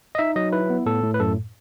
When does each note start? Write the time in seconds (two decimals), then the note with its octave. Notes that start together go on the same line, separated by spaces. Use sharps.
0.15 D#5
0.18 D#4 E5
0.36 F#3 D#5
0.52 E4 B4
0.70 B3
0.86 A2 A4
1.03 A2
1.14 B4
1.20 F#2 A4